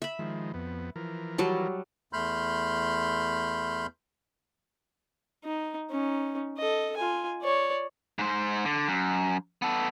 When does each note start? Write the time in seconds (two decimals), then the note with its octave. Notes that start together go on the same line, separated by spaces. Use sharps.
0.02 E5 B5
0.19 D#3 F3 G#3
0.54 F2 B3
0.96 E3 F3 A#4
1.38 F#3 G3 A5
2.13 E2 A3 B5 C6 F6 G6
5.44 D#4
5.91 C#4 D#4
6.57 A4 D#5
6.96 F4 G#5
7.42 C#5 D5
8.19 G#2 C5
8.65 D3
8.88 F#2
9.62 B3 A4